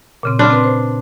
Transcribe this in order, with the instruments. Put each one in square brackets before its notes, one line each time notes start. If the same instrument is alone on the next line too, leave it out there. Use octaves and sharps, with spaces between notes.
[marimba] A#2 C#3 C4
[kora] D4 [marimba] B5 C6 F6
[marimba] C4 B4 C6
C5